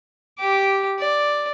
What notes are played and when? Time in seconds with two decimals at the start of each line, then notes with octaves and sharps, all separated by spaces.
0.39 G4 D6
0.99 D5